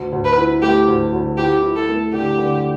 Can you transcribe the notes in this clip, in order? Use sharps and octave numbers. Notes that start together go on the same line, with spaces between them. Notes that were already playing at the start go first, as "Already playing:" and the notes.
Already playing: D2
D2
B4
E4
A3 G4
D2
D2
E4 G4
E4
A4
A3
D3 G4
D3